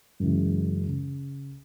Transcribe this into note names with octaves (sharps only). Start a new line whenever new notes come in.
F#2 C#3 E3 G#3
C#3